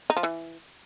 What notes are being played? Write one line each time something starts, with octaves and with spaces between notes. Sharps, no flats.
D#4
F3
E3